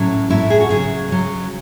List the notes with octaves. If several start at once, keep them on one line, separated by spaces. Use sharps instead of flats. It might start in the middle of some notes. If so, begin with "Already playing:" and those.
Already playing: A2 F#3 C#4
A2 F#3 E4
G#4
F#4
C#3 F#3 G#4
C#3 F#3